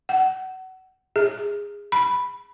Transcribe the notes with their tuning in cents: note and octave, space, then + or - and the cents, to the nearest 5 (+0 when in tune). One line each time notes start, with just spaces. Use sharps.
F#5 +25
G#4 -20
B5 +0